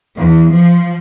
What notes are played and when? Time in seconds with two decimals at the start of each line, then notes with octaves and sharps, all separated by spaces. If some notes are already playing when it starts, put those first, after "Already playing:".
0.17 E2
0.53 F3